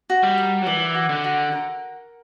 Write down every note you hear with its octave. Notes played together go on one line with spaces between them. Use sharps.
F#4
G3
A#4
F#3
E3 D5
F#4
D3
F#4
A#4